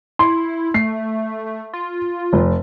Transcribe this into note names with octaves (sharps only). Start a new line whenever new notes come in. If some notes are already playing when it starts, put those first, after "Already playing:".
E4 C6
A3 C7
F4
F1